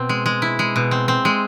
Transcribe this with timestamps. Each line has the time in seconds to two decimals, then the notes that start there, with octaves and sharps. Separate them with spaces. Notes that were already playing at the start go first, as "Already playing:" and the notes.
Already playing: B2 C4
0.09 G#3
0.26 G#3
0.42 E4
0.59 G#3
0.76 B2
0.91 C4
1.08 C4
1.25 G#3